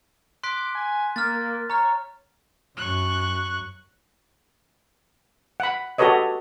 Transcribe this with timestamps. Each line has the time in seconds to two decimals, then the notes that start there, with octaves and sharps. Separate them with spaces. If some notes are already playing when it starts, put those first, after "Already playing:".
0.43 C6 D6 F#6 B6
0.75 G#5
1.16 A#3 F6 A6
1.70 C#5 A#5 F6
2.77 F#2 C#6 F#6
5.60 F#5 B5
5.98 F#4 G4 A4 B4 C#5 D#5